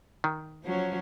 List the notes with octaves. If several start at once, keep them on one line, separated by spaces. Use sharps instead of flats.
D#3
F3 F#3 C#4